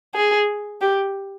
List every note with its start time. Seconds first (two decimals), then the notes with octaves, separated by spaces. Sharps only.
0.15 G#4
0.81 G4